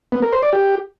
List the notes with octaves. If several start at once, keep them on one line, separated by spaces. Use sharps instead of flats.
B3
A#4
C5
D5
G4